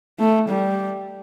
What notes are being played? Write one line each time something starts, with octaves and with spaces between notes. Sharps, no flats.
A3
G3